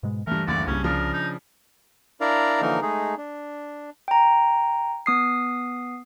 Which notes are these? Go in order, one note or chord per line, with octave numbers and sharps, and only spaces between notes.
G#2 B2 G#3
G2 E3 A3 A#4
F#1 D2 G2 D5
C2 G2 C#3 C#4
C#3 F3 D4 A#4
D#4
D4 E4 A#4 D5 F5 A#5
D3 E3 F3 A#3 D#4 A#4
G#3 A3 D#4 G#4
D4
G5 A#5
B3 D#6 C7